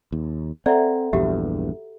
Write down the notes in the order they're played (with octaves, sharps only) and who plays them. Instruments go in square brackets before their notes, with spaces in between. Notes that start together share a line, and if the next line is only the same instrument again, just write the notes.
[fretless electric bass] D#2
[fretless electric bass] C4 [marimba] A4 F#5 A#5 [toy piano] D5 E5
[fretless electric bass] A#1 E2 G2 [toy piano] F#4 G4 E5